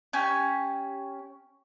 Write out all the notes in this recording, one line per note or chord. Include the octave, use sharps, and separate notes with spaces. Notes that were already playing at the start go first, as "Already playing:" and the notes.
C#4 G4 G#5